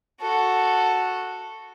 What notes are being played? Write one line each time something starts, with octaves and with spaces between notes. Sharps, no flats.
F#4 A4